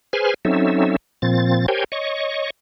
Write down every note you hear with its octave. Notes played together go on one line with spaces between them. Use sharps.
G#4 B4 C5 G#5 F6
F#3 C4 C#4 D#4 A4 E5
A#2 F3 C4 A6
G4 A#4 C5 C#5 G5 G#5
C#5 D#5 C#6